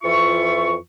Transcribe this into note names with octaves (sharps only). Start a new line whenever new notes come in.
F2 E3 F4 E5 C#6